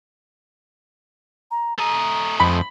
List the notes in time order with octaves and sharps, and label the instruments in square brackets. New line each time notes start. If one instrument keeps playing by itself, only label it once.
[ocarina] A#5
[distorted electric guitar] A3 D#5 [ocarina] A#5
[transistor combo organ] F2 [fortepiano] B5